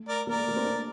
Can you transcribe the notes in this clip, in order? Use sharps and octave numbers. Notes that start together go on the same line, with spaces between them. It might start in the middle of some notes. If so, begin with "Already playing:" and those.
Already playing: A3
A#4 D5
A#3 A#4 D5
A3
A#3
C4
D4